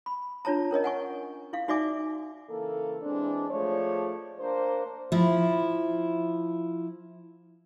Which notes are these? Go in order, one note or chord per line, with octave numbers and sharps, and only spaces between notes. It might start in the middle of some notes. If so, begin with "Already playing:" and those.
B5
D4 F4 C#5 A5 A#5
C#4 A#4 C#5 D#5
F#5 G#5 C#6
E4 F5
D#4 F#4 D5 E5 G#5 D6
C#3 E3 A#3 A4
E3 G#3 C4 D4
F3 A3 G#4 C#5 D5
A#3 D4 C5
F3 E4